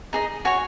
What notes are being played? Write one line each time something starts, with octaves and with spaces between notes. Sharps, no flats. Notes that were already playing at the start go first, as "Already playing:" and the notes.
D#4 G#4 D#5
F#4 C#5 G#5